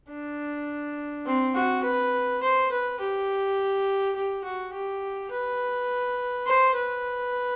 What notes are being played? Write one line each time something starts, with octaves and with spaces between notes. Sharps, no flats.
D4
C4
F#4
B4
C5
B4
G4
G4
F#4
G4
B4
C5
B4